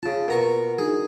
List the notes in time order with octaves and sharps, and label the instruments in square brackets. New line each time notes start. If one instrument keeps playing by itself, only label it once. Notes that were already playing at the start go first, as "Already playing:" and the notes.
[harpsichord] C#3 A5 [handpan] F4
[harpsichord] B2 A#5 C#6 [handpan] A#4
[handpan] D4 D#4 F#4 [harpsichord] G#4